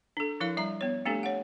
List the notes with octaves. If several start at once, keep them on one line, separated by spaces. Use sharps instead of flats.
D4 A4
F3 E4 A#4 F5
G3 E5 A#5
B3 C#5
A3 C4 D4 G4 A4
C#5 F#5